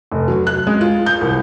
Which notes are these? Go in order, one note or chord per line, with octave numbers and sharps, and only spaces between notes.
F1
F#3
F#6
G#3
F4
G6
C2